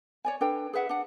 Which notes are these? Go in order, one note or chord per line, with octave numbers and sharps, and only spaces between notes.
C#5 D5 G#5
D4 A4 B4 G5
G#4 B4 E5 F#5
D4 F#5